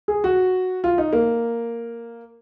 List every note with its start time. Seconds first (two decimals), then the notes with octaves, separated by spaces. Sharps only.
0.08 G#4
0.24 F#4
0.84 F4
0.98 D#4
1.13 A#3